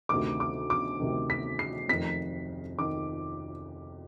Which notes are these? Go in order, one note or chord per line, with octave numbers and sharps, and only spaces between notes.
D2 C3 D#3 D6
D6
D6
D2 C3 D#3
B6
C7
F1 F2 D#3 B6
D#3 D6